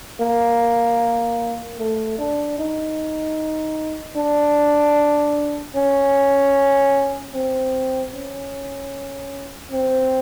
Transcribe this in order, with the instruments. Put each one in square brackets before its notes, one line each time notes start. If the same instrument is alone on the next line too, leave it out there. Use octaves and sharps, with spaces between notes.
[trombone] A#3
A3
D4
D#4
D4
C#4
C4
C#4
C4